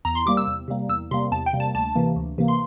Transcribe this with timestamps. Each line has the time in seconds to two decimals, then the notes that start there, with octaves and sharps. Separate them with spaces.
0.05 E2 A#5
0.15 C6
0.26 C3 G3 A#3 D6
0.37 E6
0.47 E2
0.68 C3 G3 A#3
0.89 E2 E6
1.11 C3 G3 A#3 C6
1.31 E2 A5
1.46 G5
1.53 C3 G3 A#3
1.60 A5
1.75 D2 A5
1.95 C3 E3 A#3
2.16 D2
2.38 C3 E3 A#3
2.48 C6